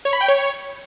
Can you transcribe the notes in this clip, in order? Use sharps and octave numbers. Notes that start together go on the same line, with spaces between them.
C#5
B5
G5
C#5